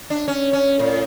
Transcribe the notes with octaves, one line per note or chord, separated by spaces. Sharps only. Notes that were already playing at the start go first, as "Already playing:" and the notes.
D4
C#4
C#4
A2